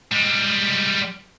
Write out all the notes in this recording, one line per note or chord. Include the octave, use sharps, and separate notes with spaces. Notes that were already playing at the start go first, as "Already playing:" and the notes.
G3 G#3